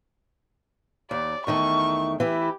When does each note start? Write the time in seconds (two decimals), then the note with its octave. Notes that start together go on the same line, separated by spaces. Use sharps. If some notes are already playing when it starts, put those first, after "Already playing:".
1.11 D#2 D5
1.47 E2 D#3 A3 C#6
2.20 E3 E4 G4